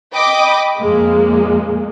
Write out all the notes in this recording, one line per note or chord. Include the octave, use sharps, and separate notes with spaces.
D#5 G5 B5 D6 D#6
F2 A#2 G#3 A#3